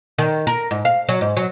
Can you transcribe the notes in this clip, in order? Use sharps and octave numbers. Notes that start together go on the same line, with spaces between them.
D#3
A#4
G#2
F5
F#3
G#2
F#3